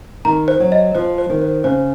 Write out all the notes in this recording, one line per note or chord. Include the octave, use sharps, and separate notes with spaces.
D#3 A#5
C5
F#3
D#5
F3 C5
C5
D#3
C5
C#3 C5